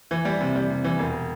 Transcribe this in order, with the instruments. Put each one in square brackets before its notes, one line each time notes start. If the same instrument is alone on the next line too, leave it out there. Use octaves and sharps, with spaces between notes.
[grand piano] E3
G3
C3
G3
C3
E3
E1